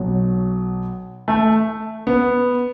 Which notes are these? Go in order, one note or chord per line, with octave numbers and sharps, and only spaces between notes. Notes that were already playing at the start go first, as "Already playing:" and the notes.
Already playing: B1 B2 F#3
A3
B3